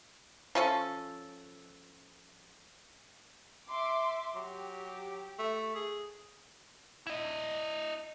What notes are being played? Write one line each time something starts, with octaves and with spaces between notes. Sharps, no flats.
F3 C#4 A4
E5 C6 D6
F#3 G4
A3
G#4
E4 D#5